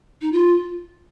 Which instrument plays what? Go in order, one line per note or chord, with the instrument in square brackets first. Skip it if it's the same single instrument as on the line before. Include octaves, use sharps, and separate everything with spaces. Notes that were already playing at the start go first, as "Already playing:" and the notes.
[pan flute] D#4
F4